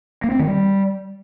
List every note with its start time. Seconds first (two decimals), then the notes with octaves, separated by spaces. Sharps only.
0.24 A#3
0.32 C4
0.39 D#3
0.47 G3